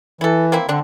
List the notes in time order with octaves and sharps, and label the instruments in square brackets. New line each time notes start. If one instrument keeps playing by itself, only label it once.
[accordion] E3 [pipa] E4 A4
[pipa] A#3 C4 E4
[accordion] D3 [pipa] C4 D4